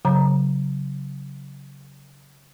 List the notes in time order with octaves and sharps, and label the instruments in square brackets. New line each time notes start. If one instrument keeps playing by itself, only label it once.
[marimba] C#3 F#3 A#5